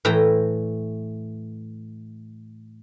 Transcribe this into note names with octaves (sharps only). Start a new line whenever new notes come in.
A2 E3 G5 A#5